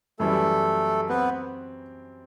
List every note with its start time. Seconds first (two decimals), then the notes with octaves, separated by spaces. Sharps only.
0.19 F#2 E3 G3 A3 A4
1.09 B3 C4 B4